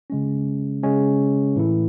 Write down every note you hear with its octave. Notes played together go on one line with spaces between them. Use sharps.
C#3 G#3 C#4
C#3 G#3 C#4
A2 E3 A3 E4